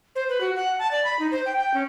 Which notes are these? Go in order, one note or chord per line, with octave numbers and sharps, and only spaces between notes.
C5
B4
F#4
F#5
A5
D5
B5
D#4
C5
G5
G5
C#4